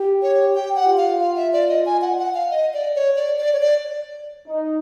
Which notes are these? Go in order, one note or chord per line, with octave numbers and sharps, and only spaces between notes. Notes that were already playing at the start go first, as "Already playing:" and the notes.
Already playing: G4
C#5
G4 G5
F#5
F4
F5
F5
E5
D5
D#5
G#5
F#5
F#5
F5
D#5
D5
C#5
D5
D5
C#5
D5
D#4